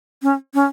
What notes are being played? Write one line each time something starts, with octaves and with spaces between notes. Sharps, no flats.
C#4
C#4